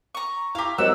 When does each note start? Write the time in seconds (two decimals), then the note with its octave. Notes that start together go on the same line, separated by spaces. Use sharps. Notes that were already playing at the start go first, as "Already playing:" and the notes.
0.15 A#5 C#6
0.55 E4 G4 F5 A#5
0.78 F#3 G3 C4 A#4 D#5 F#5 E6